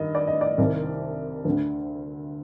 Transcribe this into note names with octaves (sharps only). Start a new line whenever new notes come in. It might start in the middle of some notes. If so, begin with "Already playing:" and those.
Already playing: G2 D#3 D#5
D5
D#5
D5
C2 C3 D#3
D2 D3